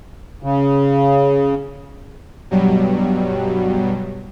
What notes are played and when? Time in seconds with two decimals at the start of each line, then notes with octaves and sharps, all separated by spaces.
0.43 C#3
2.51 G2 B2 F#3 G3